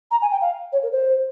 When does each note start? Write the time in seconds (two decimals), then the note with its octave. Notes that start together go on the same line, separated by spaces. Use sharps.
0.11 A#5
0.21 G#5
0.31 G5
0.41 F5
0.72 C#5
0.83 A#4
0.92 C5